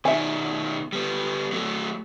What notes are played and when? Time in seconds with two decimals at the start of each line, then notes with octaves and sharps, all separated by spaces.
0.05 B2 D#3 E5 G#5
0.93 G3 B3
1.52 F#3 A3